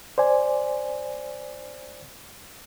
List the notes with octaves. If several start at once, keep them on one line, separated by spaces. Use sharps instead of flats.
C5 D5 G#5